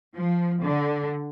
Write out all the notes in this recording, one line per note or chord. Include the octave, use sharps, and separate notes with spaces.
F3
D3